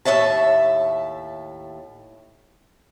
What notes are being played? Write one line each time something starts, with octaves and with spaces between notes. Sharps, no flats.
D#2 A2 C#4 C#5 E5 A5